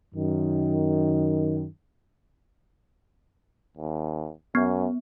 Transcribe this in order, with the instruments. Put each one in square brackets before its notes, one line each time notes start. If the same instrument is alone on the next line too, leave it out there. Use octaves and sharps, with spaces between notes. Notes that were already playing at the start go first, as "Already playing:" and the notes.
[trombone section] F#2 D#3
[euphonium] D#2
[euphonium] F#2 [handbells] B3